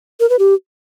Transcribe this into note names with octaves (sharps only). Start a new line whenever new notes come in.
A#4
B4
G4